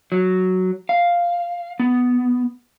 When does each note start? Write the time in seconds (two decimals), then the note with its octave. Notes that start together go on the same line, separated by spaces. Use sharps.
0.12 F#3
0.89 F5
1.80 B3